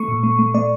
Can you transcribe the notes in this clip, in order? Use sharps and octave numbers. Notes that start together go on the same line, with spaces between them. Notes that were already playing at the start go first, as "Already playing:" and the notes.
Already playing: A3 C#6
A#2
A3
A3
A3 D5